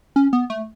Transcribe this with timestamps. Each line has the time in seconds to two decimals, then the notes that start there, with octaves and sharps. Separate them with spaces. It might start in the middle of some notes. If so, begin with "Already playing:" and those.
0.16 C#4
0.33 B3
0.50 A3